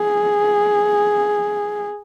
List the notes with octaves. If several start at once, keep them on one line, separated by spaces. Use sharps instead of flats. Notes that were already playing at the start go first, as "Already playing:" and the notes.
Already playing: G#4